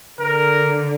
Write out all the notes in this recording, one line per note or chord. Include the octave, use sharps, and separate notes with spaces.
D3 A#4